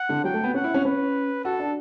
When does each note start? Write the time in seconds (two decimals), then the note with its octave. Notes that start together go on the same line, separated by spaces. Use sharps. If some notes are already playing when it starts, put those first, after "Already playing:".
Already playing: F#5
0.09 D3
0.24 F#3 G5
0.34 A3
0.44 B3
0.54 C#4 F#5
0.64 E4
0.74 C#4
0.85 C#4 B4
1.45 F#4 A4
1.60 D4